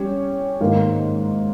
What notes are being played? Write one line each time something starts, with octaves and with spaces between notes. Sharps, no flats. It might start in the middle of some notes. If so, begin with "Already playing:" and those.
Already playing: G3 C#4 G4 C#5
G#2 D#3 A#3